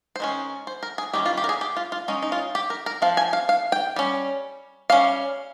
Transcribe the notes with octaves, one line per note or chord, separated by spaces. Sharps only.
C5
D#3 G#3 C#4
C5
A#4
G#4
D#3 G3 C#4 G4
F4
G4
A#4
G#4
G4
F4
F4
G#3 C#4 D#4
D#4
F4
G4
A#4
A#4
F3 C4 F5
G#5
F5
F5
G5
G3 C#4
G3 C#4 F5